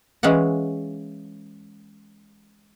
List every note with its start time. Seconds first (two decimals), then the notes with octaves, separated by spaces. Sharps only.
0.23 E3 G#3 C#4 F5 F#5